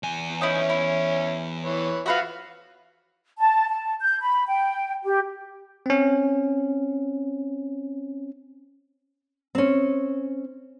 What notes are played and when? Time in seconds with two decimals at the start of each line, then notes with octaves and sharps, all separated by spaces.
0.03 E2 G#5
0.41 C#4 D#4 E4
0.70 E4
1.65 E3 B4 C#5
2.06 F3 F#4 B4 E5 F5
3.39 A5
3.69 A5
4.00 G6
4.21 B5
4.48 G5
5.04 G4
5.86 C4 C#4
9.55 C4 C#4